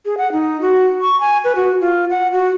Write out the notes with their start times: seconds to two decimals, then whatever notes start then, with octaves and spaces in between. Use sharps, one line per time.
0.05 G#4
0.18 F#5
0.32 D#4
0.61 F#4
1.01 C#6
1.20 G#5
1.44 B4
1.56 F#4
1.81 F4
2.10 F#5
2.33 F#4